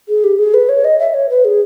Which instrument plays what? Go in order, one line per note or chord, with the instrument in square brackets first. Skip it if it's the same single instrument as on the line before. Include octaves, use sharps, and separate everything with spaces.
[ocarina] G#4
G4
G#4
B4
C#5
D#5
E5
C#5
B4
G#4